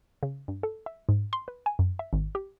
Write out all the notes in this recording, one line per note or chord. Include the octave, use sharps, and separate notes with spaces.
C#3
G2
A4
E5
G#2
C6
B4
G#5
F#2
E5
G#1
G4